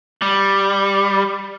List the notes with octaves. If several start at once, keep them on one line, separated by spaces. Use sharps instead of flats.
G3